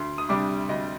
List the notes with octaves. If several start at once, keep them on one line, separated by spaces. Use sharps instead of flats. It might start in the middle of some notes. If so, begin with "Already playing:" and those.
Already playing: D2 C6
D#6
C3 G3 D4 D6
D2 D#5